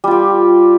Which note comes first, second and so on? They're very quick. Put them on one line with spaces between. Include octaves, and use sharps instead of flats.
G3 F4 G4